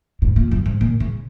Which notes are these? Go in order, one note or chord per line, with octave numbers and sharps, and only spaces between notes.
G#2
A#2
F#2
G#2
A#2
C#3